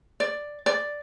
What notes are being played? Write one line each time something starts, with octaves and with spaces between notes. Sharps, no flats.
D5
D5